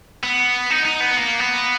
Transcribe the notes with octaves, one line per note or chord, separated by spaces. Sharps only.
B3
D#4
D#4
B3
A#3
B3